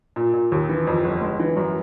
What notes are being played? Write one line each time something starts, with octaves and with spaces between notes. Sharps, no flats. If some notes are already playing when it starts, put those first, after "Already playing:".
A#2
A#2
D#2
E3
F2
G1
G#3
E3
F#2